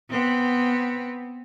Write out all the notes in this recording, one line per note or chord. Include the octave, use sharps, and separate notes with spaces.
B3 C4